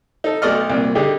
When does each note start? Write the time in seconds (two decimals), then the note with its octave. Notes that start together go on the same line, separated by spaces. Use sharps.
0.24 D#4 A4
0.42 B1 A3 F#4 D5 D#5 F6
0.70 C2 A#2
0.95 D3 D#4 G4 G#4